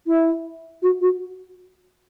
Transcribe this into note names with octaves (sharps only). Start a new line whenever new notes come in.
E4
F#4
F#4